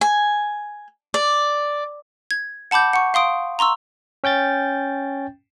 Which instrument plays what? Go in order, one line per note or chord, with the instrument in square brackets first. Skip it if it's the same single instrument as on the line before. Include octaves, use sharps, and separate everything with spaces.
[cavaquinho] G#5
D5
[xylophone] G#6
F#5 A5 B5 D6 G6
F#5 C#6
F5 C6 D#6 D7
A#5 C6 C#6 E6
[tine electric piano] C#4 G5 G6 A6